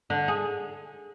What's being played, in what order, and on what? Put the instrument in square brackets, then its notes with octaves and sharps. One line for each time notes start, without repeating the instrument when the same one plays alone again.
[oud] D3
G#4